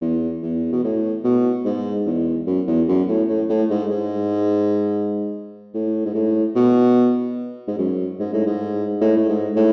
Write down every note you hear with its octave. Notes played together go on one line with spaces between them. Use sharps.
E2
E2
B2
A2
B2
G#2
E2
F#2
E2
F#2
A2
A2
A2
G#2
G#2
A2
G#2
A2
B2
G#2
F#2
G#2
A2
G#2
A2
A2
G#2
A2